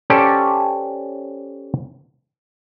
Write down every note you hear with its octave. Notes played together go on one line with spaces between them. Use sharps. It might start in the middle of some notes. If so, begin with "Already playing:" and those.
C#4 G4 A4 C5 D5